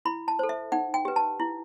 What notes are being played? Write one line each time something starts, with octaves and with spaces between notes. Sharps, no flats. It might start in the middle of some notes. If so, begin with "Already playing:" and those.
E4 B5
A5
A4 C5
E5
D#4 F#5
G5
G4 B4
A5
E4